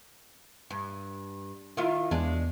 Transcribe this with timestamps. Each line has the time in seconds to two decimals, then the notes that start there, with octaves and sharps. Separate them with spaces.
0.71 G2
1.77 D#3 E4 F4
2.11 E2 G#3 D4